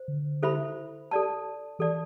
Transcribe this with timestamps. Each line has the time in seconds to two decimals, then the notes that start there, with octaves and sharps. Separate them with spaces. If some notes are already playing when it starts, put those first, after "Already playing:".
Already playing: C5
0.08 D3
0.43 E4 A4 C5 E5 B5
1.11 A4 D5 A5
1.79 E3 A4 D5 A5